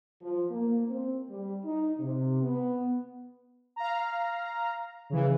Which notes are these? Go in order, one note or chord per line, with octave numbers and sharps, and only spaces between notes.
F3
A#3
C4
G3
D#4
C3
B3
F5 A#5
C#3 E3